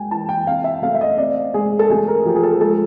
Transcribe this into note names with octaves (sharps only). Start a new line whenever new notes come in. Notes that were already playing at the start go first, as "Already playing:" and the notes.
Already playing: F#3 G#3 G5 G#5
E3 A5
G5
C4 F5
E5
A3 F5
E5
D#5
C4 D5
G#3 G#4
A4
A3 G#4
A#4
F3 G4
G#4
A4
G#3 A4